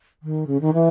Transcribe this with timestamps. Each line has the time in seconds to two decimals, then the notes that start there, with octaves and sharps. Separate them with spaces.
0.23 D#3
0.47 C#3
0.61 D#3
0.74 E3